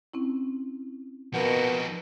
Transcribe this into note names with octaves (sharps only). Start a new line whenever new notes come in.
C4 C#4 E4
B2 D#3 F3 A#3 D#4